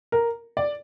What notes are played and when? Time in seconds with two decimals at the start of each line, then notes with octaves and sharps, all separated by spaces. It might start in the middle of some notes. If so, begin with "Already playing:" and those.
0.12 A#4
0.57 D5